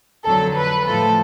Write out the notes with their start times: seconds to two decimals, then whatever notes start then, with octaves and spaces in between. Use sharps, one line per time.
0.25 F2 D3 F#3 A4
0.56 B4
0.86 A2 F3 A3 A4